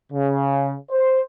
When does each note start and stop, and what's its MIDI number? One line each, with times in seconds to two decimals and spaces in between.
0.11 0.74 49
0.91 1.19 72